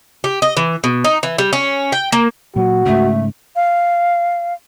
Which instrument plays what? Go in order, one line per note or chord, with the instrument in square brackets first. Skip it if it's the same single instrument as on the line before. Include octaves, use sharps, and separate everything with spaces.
[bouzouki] G4
D#5
E3
B2
D#4
E3
G3
C#4
G5
A#3
[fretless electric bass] A#2 F#3 [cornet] F#4
[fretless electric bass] G#2 C#3 [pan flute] A3
[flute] F5